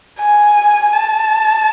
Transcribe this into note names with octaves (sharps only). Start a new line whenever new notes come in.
G#5
A5